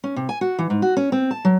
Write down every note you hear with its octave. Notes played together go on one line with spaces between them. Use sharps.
C#4
C3
G#5
F#4
E3
G#2
F#4
C#4
C4
A5
F#3